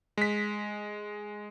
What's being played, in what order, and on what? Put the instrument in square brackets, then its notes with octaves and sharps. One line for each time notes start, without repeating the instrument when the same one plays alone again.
[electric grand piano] G#3 B6